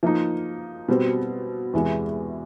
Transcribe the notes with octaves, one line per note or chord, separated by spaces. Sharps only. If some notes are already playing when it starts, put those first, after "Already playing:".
F3 A#3 D#4
B2 G3 C4
E2 C3 E3 G#3